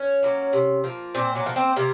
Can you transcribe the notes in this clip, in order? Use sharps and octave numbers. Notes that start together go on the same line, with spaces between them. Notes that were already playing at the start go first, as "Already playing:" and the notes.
Already playing: C#4 C#5
F#3 A#3
C3
F3 A#3
A#2 C4 C5
F#3 F#4
F3 A#3
C4 C5
C3 A#3 A#4